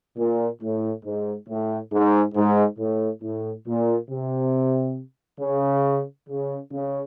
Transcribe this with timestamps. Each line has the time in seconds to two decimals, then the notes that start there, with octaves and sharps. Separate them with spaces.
0.17 A#2
0.61 A2
1.04 G#2
1.48 A2
1.92 G#2
2.35 G#2
2.79 A2
3.22 A2
3.66 A#2
4.10 C3
5.40 C#3
6.28 C#3
6.71 C#3